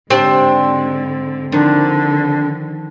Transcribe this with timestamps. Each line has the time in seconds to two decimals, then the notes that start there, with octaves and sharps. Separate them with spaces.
0.10 G#2 D3 C4 D4 G4 C5
1.52 D3 D#3 F3 D4